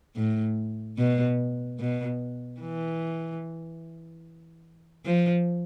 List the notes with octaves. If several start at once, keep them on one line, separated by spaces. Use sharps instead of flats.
A2
B2
B2
E3
F3